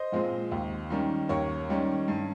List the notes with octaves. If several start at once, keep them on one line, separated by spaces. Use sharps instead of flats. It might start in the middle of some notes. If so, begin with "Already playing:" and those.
Already playing: C5 D#5
A#2 F3 G#3 C4
D#2
D#3 G3 C#4
D#2 A#4 C#5
D#3 G3 C#4
G2